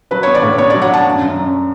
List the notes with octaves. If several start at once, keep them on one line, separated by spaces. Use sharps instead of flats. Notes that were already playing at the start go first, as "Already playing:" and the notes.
F#3 B4
B3 C#5
D5
A2
B3 C#5
F#3 D5
F#5
D4 A5
F#2
F#2
F#2